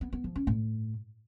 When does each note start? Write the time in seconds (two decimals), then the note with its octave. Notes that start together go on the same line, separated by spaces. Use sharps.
0.01 B3
0.13 B3
0.24 F3
0.36 C#4
0.47 A2